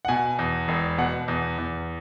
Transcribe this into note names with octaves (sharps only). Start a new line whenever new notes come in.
F#5
B2 G#5
E2
E1
B2 F#5
E2
E2